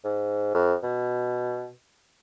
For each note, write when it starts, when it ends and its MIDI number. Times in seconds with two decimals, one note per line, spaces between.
0.05 0.53 44
0.54 0.75 41
0.83 1.69 47